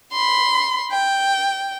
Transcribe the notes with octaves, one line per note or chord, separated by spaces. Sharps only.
B5 C6
G5